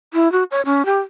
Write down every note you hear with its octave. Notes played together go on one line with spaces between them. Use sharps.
E4
F#4
C#5
C#4
G4